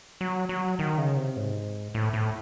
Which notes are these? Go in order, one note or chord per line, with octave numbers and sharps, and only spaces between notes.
F#3
F#3
D#3
C#3
C3
G#2
A2
A2